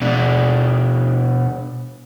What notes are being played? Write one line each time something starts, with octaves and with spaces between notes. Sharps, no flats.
B2 D4